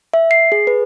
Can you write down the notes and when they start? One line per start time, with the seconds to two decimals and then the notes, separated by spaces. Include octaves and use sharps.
0.14 E5
0.31 C7
0.52 G#4
0.67 B4